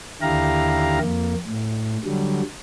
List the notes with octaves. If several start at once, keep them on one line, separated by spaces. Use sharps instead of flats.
D#2 D3 E4 G4 F5 A#5
F2 A#3
A2
D3 F#3 G3